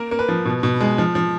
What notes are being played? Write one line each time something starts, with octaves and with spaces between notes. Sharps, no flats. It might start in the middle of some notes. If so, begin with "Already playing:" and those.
Already playing: A#3 A#4
A#3
B4
F3
B2
B2
G#3
F3
F3